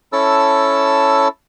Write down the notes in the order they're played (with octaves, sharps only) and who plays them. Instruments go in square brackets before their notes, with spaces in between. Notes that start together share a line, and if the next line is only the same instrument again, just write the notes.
[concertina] C#4 E4 A4 A5 E6